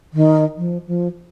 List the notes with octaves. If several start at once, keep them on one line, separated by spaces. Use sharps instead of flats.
D#3
F3
F3